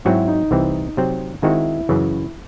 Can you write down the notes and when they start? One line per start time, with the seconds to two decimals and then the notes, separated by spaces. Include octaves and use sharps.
0.05 G#2 F#3 C4 E4 F#4
0.28 D#4
0.51 C2 C3 E3 C4
0.97 C3 F#3 C4
1.42 D#3 G#3 C4 D#4 E4 F#4
1.89 F#2 C#3 E3